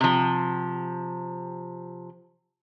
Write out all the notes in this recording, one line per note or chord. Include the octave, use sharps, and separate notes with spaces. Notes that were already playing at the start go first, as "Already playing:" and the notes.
C3 F3